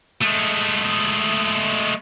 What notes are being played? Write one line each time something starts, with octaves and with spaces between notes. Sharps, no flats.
G#3 A3